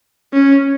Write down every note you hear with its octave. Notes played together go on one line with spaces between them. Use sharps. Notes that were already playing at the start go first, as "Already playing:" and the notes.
C#4